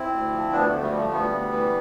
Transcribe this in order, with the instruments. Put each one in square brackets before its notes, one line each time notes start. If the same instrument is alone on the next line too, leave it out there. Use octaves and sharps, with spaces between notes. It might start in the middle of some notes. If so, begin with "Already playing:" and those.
Already playing: [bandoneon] C4 E4
D2
F3
D2 B3 D4
D2 A3
G3
F3 A3
D2 G3 B3
D2
E3